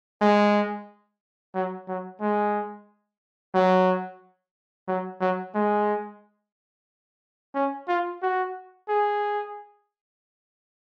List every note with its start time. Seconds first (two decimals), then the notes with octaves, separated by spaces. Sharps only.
0.22 G#3
1.55 F#3
1.88 F#3
2.21 G#3
3.55 F#3
4.88 F#3
5.21 F#3
5.55 G#3
7.55 C#4
7.88 F4
8.22 F#4
8.89 G#4